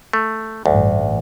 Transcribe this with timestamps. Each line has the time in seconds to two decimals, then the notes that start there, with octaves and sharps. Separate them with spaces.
0.13 A3
0.66 A1 D2 G2